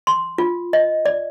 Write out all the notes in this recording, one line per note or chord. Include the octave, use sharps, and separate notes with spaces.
C6
F4
D#5
D5